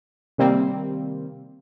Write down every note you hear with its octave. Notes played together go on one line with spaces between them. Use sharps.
C3 D#3 G3 A#3 C4